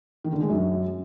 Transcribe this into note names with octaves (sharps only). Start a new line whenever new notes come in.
D#3
D3
G#3
F#2